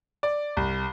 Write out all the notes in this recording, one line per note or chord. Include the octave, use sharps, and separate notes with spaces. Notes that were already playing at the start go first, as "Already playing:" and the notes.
D5
C2